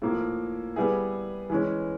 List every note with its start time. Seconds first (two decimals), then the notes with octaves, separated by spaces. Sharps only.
0.02 A2 F3 A#3
0.76 G3 B3 E4 G#4
1.50 E3 G#3 C#4